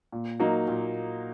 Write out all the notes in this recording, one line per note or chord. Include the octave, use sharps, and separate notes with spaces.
A#2
F#3 A#3 D#4
A#2